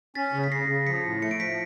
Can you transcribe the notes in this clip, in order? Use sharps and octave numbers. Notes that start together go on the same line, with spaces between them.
C#4 A6 B6
C#3
B6
C#3 A#6 C7
C#3
F3 B6 C#7
A2
A3 C#7
D7
F3 B6 C#7